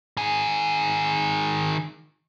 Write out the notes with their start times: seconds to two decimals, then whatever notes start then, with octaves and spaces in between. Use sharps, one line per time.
0.17 D#3 G#4